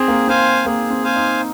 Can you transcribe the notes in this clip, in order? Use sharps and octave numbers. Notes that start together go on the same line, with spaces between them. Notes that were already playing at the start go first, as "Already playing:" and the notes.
Already playing: C4 G#4
A#3
C4 C5 F5 G#5
A#3 G#4
C4
C5 F5 G#5
D#4